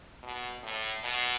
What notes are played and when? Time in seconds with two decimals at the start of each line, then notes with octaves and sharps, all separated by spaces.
0.23 B2
0.63 A2
1.04 B2